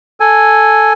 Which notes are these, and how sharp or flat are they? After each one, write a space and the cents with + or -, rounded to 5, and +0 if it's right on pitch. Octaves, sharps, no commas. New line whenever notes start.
A4 +0 G#5 +0